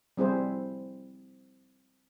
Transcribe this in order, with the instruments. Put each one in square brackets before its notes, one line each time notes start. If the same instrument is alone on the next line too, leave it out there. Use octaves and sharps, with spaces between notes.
[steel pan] G3 C4 E4 G#4 C5